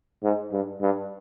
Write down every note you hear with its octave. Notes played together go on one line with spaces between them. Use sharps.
G#2
G2
G2